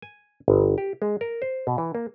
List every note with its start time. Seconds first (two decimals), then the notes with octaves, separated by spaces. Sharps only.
0.02 G#5
0.48 G1
0.78 G4
1.02 G#3
1.21 A#4
1.42 C5
1.67 B2
1.78 E3
1.95 A#3